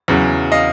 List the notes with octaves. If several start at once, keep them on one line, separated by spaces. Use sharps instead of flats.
E2 C#3 F#3
D#5 F5